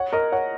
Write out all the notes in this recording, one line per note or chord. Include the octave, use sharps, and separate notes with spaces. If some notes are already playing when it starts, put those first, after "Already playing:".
Already playing: C#5 F#5
A#4 D#5
C#5 F#5